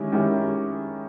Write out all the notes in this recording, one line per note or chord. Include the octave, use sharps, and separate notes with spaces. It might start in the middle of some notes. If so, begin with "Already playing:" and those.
Already playing: D#3 G#3 C#4 E4 G4
D#3 G#3 C#4 E4 G4